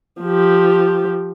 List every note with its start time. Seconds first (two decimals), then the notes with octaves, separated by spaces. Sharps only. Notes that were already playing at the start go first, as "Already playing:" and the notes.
0.22 F3 G4